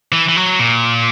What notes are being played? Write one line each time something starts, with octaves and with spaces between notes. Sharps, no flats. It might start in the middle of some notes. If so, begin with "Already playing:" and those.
E3
E3
F#3
A#2